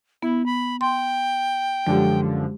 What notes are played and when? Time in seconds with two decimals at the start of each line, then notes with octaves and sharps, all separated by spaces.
0.23 B3 E4
0.46 B5
0.81 G5 C6
1.87 F#2 D3 F3 G#3 G4